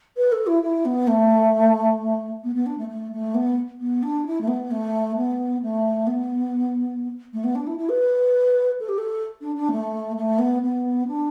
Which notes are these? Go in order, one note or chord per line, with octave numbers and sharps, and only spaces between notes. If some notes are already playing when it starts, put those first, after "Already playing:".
B4
A4
E4
E4
B3
A3
B3
B3
D4
A3
A3
A3
B3
B3
D4
E4
A3
B3
A3
B3
A3
B3
A3
B3
D4
E4
E4
B4
A4
G4
A4
D4
D4
A3
A3
B3
B3
D4